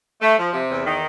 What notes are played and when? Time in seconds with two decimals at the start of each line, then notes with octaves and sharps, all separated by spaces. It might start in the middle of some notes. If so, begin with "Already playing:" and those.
0.22 A3
0.38 F3
0.53 C3
0.70 E2
0.86 D#3